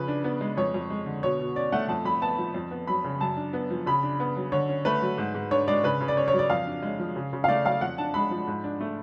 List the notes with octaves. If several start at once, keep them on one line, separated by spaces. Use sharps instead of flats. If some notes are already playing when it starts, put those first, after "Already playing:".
Already playing: C#3 F3 B4
D4
B3
G#3
F2 C#5
F2
G#3
D3
B2 C#5
B2
C#4 D5
A3 F#5
F2 A5
F2 B5
B3 A5
F3
F2
B3
F#3 B5
C#3
F#2 A5
D4
B3
F3
C#3 B5
D4
B3
F#3
D3 C#5
C#4
A3 B4
F#3
G#2
G#2
D4 C#5
G#3 D5
C#3 B4
C#3
D5
C#4 C#5
C#5
F#3
D5
F2 F5
D4
G#3
F3
C#3
C#3
F5
A3 D5
F#3 F5
F2 F#5
D4 A5
G#3 B5
F3
G#2
D4
A3